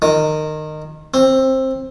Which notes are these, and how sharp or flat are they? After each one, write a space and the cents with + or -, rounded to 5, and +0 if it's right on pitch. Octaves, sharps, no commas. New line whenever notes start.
D#3 -20
C4 +15